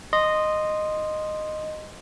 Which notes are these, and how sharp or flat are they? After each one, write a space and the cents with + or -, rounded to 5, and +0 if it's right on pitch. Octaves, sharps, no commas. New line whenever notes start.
D#5 -10 C6 +0